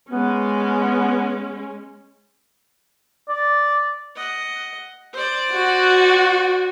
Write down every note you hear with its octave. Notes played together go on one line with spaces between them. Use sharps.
G#3 B3 C#4
D5
D#5 F#5
C5 D5
F#4